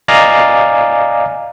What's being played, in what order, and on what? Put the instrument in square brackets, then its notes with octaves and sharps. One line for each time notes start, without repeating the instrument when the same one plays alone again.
[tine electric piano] D5 D#5 F5 G#5 A#5